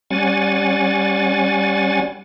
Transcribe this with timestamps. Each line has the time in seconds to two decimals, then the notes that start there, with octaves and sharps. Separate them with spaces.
0.10 G3 C#4 F#5 G#5 A6